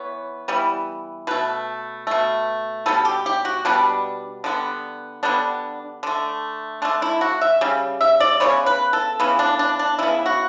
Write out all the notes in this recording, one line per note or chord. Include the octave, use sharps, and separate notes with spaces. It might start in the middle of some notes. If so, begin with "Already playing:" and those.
Already playing: E3 B3 C#5
E3 G3 B3
B2 A3 B4
B2 A3
B2 G3 B3 A4
G4
G4
F#4
B2 G3 B3 D4
D3 G3 B3
D3 G3 B3 D4
D3 A3
D3 A3 D4
E4
F#4
E5
C#3 G3
E5
D5
C#3 G3 B3 C#5
B4
A4
C#3 E3 B3
D4
D4
D4
C#3 E3 B3 E4
F#4